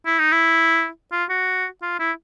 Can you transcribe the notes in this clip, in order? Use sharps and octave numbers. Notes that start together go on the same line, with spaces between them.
E4
D#4
E4
F4
F#4
F4
E4